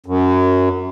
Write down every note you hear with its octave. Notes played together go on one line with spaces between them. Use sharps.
F#2